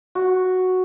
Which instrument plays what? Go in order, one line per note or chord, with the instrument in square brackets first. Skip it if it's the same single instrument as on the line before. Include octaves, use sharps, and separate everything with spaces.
[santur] F#4